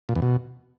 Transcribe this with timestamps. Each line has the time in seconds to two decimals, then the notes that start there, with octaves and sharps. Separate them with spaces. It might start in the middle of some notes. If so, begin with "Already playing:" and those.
0.09 A#2
0.15 E2
0.22 B2